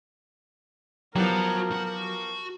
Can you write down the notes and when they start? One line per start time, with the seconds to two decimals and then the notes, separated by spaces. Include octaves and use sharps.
1.16 F3 F#3 B3 F#4 G4 A#4 A#5
1.72 F#4